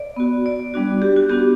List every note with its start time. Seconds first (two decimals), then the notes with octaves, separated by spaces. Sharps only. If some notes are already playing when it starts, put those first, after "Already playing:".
Already playing: D5
0.16 B3 F#4
0.46 D5
0.74 G3 B3 D4 F#4
1.02 G4
1.16 F#4
1.30 B3 D4 F#4 G4